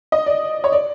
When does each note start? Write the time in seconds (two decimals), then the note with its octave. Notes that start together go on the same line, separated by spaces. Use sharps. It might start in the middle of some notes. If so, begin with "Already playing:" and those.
0.12 D#5
0.26 D5
0.64 C#5
0.72 D5